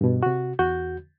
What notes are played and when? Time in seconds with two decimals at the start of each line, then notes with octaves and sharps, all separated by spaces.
0.01 G2 B2
0.23 C3 F#4
0.59 E2 F#4 G6